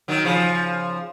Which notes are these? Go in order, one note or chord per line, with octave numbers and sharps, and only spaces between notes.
D#3 F#3
C#3 F3